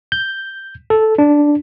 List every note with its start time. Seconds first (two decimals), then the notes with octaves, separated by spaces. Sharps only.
0.12 G6
0.90 A4
1.18 D4